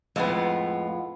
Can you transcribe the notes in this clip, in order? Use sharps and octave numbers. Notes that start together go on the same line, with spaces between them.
F2 A2 G#3 B3 F4